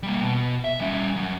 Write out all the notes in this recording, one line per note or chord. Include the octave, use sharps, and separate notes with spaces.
G3 A#3
B2
E5
G3 C#4
F#2